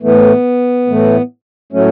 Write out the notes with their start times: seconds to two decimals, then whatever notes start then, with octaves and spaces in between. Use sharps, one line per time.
0.02 A2 E3 A3 B3
0.87 A2 E3 A3
1.72 A2 F#3 A3 C#4